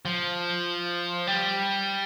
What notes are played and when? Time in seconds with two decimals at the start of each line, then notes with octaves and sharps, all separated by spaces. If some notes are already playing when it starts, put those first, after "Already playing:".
0.05 F3
1.27 G3